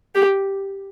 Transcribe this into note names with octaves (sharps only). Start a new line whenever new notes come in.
G4